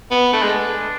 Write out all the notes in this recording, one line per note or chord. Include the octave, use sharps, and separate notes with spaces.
B3
A3 D4
G#3